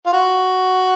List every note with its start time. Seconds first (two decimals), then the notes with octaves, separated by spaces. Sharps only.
0.06 F4
0.13 F#4